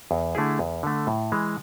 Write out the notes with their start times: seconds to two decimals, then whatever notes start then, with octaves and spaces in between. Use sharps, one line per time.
0.11 E2
0.35 D3 A3 E4 G#4
0.59 E2
0.83 D3 A3
1.07 A2
1.32 E3 G#3